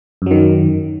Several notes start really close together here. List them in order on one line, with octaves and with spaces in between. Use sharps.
F#2 F#3 D#3